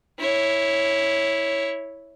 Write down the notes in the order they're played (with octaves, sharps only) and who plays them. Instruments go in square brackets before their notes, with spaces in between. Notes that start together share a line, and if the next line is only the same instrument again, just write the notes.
[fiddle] E4 C#5